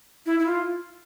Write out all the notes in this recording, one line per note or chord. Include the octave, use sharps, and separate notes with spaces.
E4
E4
F4